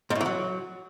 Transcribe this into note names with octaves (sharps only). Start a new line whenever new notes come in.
G#2
A2
E3
F#3